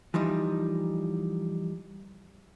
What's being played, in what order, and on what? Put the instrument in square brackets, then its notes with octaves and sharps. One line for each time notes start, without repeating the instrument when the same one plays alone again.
[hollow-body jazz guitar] E3 F3 G3 D#4